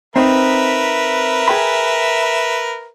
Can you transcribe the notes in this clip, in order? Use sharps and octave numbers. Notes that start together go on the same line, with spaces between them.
C4 D#4 A#4 B4 E5
G#4 G5 B5